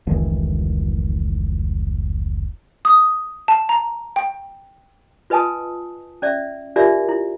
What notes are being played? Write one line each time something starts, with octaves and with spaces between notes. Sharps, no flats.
F1 C#2 D#3 E3
D#6
A5
A#5
G5
F4 B4 D#5 G#5 A5 D#6
C#4 D5 E5
D4 F4 G4 A#4 D5 E5
E4